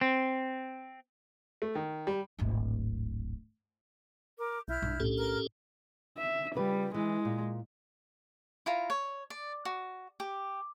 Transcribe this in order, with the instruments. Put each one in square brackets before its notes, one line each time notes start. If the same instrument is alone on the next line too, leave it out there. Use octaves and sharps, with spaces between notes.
[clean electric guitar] C4
[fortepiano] A3
D#3
G3
[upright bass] D1 G#1
[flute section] A#4 D6
[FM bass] B1 [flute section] E4 F6 G6
[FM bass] B1 [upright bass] G2
[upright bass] A2 D4 [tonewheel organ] C#4 G4 A4
[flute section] A#4 F6
[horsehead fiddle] E5
[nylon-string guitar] C#3 F4 B4 [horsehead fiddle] G3
[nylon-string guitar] E3 [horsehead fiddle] G#3
[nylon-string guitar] A#2
[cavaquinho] E4 F4 A#5
C#5
D5
F#4
G4